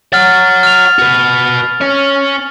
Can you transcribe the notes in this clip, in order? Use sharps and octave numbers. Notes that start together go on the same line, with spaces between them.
C#5 F#5 F6 A6
F6 F7
F#4 B4
C#4 C#5